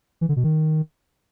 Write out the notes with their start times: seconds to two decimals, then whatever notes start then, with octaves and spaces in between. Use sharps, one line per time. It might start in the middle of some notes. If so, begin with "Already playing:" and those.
0.21 E3
0.29 D3
0.36 B2
0.44 D#3